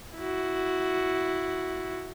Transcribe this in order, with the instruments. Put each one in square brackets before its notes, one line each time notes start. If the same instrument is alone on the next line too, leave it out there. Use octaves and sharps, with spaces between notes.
[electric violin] E4 F#4